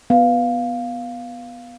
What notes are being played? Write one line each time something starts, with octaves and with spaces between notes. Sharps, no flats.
B3 F5